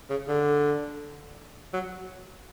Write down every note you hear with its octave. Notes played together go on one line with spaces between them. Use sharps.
C#3
D3
F#3